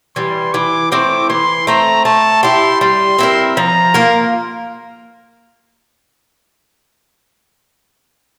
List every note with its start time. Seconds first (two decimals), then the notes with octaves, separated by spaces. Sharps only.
0.16 E3 G3 C6
0.53 E3 D6
0.91 A3 C4 E4 D6
1.29 E3 C6
1.67 A3 C4 A#5
2.05 A3 A5
2.43 E4 G4 C6
2.81 G3 C6
3.19 C4 E4 A#4
3.57 F3 A#5
3.94 A#3 F4 A#4